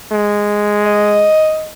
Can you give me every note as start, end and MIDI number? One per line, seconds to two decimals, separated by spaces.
0.12 1.29 56
0.85 1.71 75